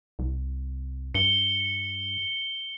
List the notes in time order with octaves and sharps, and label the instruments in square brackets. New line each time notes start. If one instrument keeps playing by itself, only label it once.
[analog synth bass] C2
[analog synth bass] G2 [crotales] C#7 G7